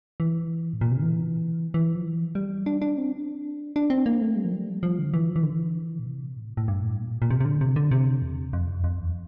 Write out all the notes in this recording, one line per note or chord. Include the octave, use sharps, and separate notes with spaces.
E3
A2
A#2
C3
D3
E3
E3
F3
E3
G3
D4
D4
C4
D4
D4
C4
A#3
A3
G3
F3
G3
F3
D3
E3
F3
E3
D3
E3
A#2
C3
A2
A2
G2
A2
A#2
A#2
C3
C3
D3
C3
D3
C3
E2
F2
G2
F2
E2